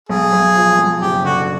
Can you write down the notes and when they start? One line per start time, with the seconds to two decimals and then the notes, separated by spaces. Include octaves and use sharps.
0.09 B1 G#4
0.33 B1
0.56 F3
0.79 B1
1.01 F#1 G4
1.24 D3 F#4